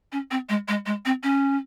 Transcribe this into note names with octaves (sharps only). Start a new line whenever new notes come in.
C#4
C4
G#3
G#3
G#3
C4
C#4